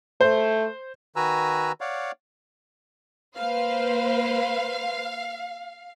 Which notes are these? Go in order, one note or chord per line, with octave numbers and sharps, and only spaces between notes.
A3 C5
D#3 F#4 B4 G#5 A#5 E6
C#5 D5 F5 F#5
A#3 B4 C5 F5